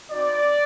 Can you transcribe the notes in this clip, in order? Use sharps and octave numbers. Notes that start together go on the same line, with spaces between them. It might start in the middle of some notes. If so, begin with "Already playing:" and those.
C4 D#4 F#4 D5